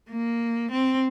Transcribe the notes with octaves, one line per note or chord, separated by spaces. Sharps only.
A#3
C4